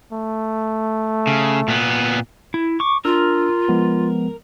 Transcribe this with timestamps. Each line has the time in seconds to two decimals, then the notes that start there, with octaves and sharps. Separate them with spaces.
0.12 A3
1.27 C#3
1.68 A#2 B3
2.54 E4
2.80 C#6 D6
3.05 D4 F4 A#4 E6 F6
3.69 F3 G#3 B3